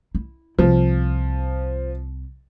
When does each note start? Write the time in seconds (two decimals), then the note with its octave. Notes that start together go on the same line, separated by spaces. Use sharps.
0.15 E4
0.59 C2 F3